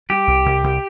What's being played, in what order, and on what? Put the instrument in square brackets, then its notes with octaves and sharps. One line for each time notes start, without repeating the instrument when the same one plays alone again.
[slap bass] G3 [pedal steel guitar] G4
[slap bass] C2
C2
C2